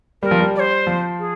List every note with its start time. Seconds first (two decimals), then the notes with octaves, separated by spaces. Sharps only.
0.22 G3 A#4
0.31 F3
0.40 G3
0.55 D5
0.59 C5
0.87 F3
1.18 G#4